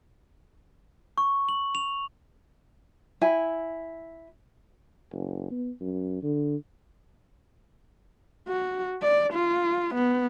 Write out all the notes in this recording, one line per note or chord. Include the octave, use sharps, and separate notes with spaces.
C#6
F#7
F7
E4 G#5
F#1
B3
F#2
D3
F#4
D5
F4
B3